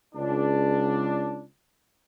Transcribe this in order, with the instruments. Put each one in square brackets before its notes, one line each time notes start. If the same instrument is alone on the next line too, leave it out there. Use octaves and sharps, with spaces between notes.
[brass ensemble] C#2 D4